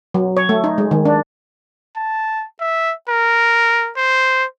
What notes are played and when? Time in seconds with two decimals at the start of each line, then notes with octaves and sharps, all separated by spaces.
0.14 F#3
0.37 C#5
0.49 A3
0.64 D#4
0.78 G#3
0.91 D#3
1.05 D4
1.97 A5
2.61 E5
3.10 A#4
3.97 C5